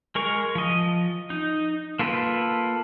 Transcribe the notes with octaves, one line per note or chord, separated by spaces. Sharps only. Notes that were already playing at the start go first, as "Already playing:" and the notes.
G#3 A#4 C#6
F3 D#5
D#4
A#3 F4 A4 B4